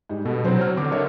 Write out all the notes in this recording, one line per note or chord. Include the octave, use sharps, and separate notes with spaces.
G#2 G3
B2 A4
F#3 C4 E4 C5
F6
D3 D6
A#4 C#5 E5